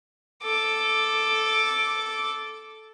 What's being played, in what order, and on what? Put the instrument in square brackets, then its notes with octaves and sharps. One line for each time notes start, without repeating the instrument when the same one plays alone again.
[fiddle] A4 D6